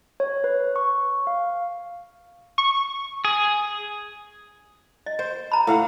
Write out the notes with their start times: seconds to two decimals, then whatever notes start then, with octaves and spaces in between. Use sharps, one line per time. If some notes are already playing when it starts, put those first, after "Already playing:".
0.20 C#5
0.44 B4
0.76 C#6
1.27 F5
2.58 C#6
3.25 G#4
5.06 D#5
5.19 C5
5.52 A#5 B5
5.67 A2 F5 F#5